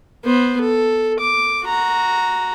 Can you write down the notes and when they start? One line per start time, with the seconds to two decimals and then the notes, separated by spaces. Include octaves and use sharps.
0.25 B3 C5
0.61 A4
1.20 D6
1.64 F#4 A#5